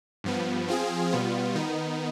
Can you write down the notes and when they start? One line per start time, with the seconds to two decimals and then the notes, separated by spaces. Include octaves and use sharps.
0.24 G2 F3 B3
0.68 F3 C4 F4 G#4
1.11 B2 G3 B3 F4
1.55 D#3 B3 D#4